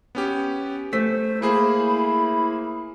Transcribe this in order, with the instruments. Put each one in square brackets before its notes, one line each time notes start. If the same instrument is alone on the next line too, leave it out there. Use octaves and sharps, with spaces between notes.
[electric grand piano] B3 C#4 G4
[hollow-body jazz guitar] A3 [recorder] C5 [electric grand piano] B6
[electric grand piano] A#3 G#4 C5 [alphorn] E4 [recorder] B5